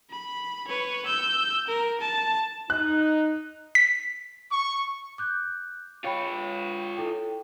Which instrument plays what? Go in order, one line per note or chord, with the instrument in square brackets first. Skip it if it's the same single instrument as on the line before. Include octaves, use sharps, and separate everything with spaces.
[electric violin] B5
B4 C#5
E6 G6
A#4
A5
[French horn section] D#4 [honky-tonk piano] F#6
[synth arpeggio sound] B6
[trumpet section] C#6
[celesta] D6 F#6 G6
[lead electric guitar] F4 C#5 [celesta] F5 G5 B5
[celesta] E4 A4 G5